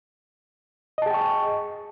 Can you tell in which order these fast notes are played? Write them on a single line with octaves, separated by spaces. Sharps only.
D#5 A5 G#4 G5 C#6